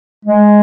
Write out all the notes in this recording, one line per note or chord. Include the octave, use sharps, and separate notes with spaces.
G#3